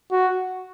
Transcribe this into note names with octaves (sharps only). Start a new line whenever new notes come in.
F#4